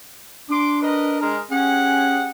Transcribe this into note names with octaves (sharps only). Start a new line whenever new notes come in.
D4 C6 D6
A#4 B4 D#5
G#3 A#4
C#4 G4 G#4 F#5